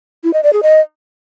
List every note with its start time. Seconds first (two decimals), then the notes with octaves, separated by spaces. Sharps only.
0.24 E4
0.34 D#5
0.43 D5
0.53 G#4
0.63 D#5